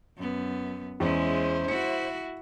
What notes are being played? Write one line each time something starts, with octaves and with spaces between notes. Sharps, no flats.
F#2 B3
E2 G#3 C#4 E4 C5
E4 F#4 C#7